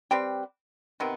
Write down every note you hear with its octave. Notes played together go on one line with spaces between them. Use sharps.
G3 C4 G4 B4
C3 D#3 B3